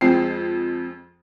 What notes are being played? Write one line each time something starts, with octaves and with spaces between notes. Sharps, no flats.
F2 G#3 C4 C7